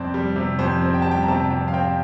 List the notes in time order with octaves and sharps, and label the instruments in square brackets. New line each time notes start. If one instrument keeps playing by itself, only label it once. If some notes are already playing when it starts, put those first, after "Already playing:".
Already playing: [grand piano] F2 C3 G3 C4 C5 D5
G3
C3
F2 C5
C4
G5
G3 A5
G5
A#5
C3 A5
F2 G5
F5
C4 G5